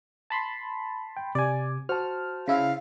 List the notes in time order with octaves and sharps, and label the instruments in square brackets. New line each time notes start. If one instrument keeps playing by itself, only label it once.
[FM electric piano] A5 B5 C6
[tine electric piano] G5
[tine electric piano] C3 [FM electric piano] D5 G#5
[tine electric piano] F#4 [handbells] C5 A5 [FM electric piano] F6
[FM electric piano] C#3 E4 E5 [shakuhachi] F5